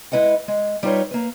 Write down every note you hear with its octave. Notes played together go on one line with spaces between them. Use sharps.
G#3 E4 B4 D#5 F#5
G#3
G3 D#4 F4 B4 C#5
A#3 B4